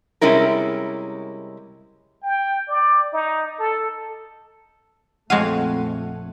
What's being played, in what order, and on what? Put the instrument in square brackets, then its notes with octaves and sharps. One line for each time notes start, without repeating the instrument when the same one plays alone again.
[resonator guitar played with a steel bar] C3 G3 G#3 C#4 E4 A#4
[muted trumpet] G5
D5
D#4
A4
[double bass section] A#1 A3 [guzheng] F2 C#5 F5 [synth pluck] G#3 D#7 [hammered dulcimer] F#5